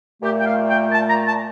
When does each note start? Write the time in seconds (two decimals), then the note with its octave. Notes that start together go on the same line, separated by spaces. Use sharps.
0.22 A#2 A3 G4
0.39 G5
0.45 F5
0.68 G5
0.92 A5
1.09 A#5
1.26 A5